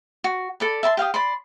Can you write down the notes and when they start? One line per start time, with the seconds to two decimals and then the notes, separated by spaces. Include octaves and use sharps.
0.24 F#4
0.60 A4 D5 B5
0.83 E5 A5 B5 C6
0.97 G4 F5 G5 D#6
1.14 D5 B5 C6